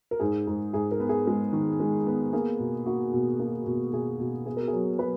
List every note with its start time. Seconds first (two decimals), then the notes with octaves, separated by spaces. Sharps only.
0.11 A#4
0.20 G#2 G#4
0.47 G#2
0.73 G#2 G#4
0.91 A#4
1.00 B3
1.09 G#4
1.27 G#3
1.53 D#3
1.80 G#3
2.07 B3
2.33 A#3 G#4
2.60 B2
2.86 A#3 F#4
3.13 B2
3.39 A#3
3.66 B2
3.92 B2 G#4
4.20 B2
4.46 B3 G#4
4.57 A#4
4.68 G#4
4.73 F#3
4.99 F#3 B4